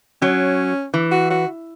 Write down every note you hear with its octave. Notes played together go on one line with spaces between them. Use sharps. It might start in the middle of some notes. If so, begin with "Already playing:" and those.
F#3 C#4
E3
F#4
F#4